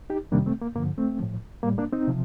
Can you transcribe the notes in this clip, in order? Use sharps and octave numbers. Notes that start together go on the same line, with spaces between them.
D#4 G4
F2 C3 D#3 G3 A#3 D4
A3 C4
A#3
G2 D3 F3 A#3
A3 C4
A2 F3
A2 G3 A#3
A#3 D4
C4 D#4
C3 F3